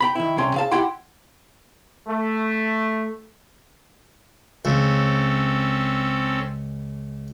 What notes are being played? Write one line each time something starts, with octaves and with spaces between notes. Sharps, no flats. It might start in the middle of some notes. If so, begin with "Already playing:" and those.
G5 A#5 B5
D#3 E4
C2 C#4 G5 C6
C#3 F5 A5
E4 G4 F#5 G5 C6
A3
C#2 C4 C#4 A4